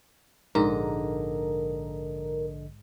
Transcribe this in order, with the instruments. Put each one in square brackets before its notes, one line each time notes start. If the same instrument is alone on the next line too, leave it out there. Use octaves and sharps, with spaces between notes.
[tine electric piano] A#1 D3 D#5 [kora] G#2 [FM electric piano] A#4